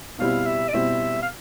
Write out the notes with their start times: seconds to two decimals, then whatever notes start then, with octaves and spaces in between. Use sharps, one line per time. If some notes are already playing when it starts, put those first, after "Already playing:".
0.18 B2 G3 C4 E4 F5
0.46 E5
0.68 D5
0.74 B2 G3 C4 E4 E5
1.22 F5